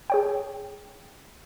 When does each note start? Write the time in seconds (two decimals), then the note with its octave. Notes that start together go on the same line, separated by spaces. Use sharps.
0.10 G#4 C#5 G5